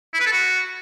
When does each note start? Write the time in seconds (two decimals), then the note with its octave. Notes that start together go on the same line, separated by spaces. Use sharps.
0.14 E4
0.20 B4
0.26 A4
0.32 F#4